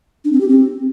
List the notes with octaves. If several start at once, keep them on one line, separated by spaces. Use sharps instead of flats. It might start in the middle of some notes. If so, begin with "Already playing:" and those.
D4
C4
G4
C4